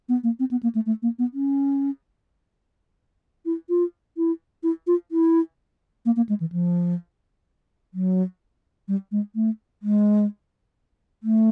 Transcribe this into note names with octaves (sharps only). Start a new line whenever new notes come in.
B3
A#3
C4
B3
A#3
A3
A3
A#3
B3
C#4
E4
F4
E4
E4
F4
E4
A#3
A#3
G#3
E3
F3
F#3
G3
G#3
A3
G#3
A3